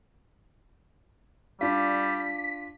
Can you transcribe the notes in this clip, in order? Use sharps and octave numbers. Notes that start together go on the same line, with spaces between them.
G3 D4 F4 B6